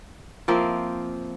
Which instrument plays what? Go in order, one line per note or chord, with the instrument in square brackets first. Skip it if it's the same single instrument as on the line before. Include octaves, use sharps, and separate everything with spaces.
[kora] F3 A#3 C4 E5